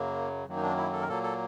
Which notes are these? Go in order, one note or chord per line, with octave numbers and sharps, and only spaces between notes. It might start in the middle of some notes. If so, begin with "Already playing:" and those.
Already playing: F#2 C#3 F#3 A#3
F#2 D#3 F#3 A#3
D#4
D4
E4
A4
A#4
A#2 F#3 A#3 A4
A4